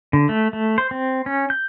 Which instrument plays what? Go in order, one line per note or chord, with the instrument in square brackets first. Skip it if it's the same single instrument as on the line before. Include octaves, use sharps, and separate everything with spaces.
[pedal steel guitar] D3
A3
A3
C5
C4
C#4
G6